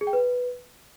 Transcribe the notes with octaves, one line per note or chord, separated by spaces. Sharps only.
G#4
G5
B4